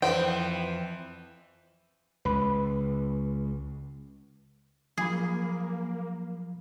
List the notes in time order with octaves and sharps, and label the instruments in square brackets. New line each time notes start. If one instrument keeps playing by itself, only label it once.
[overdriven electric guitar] F2 [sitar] E3 [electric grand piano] B4 C5 [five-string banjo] G5
[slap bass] C#2 [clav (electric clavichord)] B4
[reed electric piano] F3 F#3 B5 [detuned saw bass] A#3 [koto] G#4